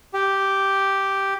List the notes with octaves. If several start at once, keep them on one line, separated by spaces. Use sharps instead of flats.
G4